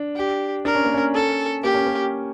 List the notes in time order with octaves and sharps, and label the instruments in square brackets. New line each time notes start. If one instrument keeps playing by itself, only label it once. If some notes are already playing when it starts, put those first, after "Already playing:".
Already playing: [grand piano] D4
[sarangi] G4
[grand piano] D4 [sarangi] A#4
[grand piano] C#4
A#3
C#4
[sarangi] A4
[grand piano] A#3 [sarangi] G4
[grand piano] C#4
A#3